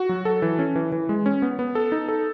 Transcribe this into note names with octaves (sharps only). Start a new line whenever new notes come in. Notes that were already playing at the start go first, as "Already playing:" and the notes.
Already playing: F#4
F#3
A4
E3
C#4
E3
E3
G#3
C#4
B3
B3
A4
D#4
A4